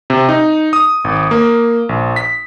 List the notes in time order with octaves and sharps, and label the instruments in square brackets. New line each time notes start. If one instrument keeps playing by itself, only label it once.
[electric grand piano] C3
D#4
D#6
G#1
A#3
A#1
B6